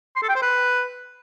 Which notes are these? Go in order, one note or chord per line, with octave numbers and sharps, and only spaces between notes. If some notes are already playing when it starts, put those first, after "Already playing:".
C6
A4
G5
C5
B4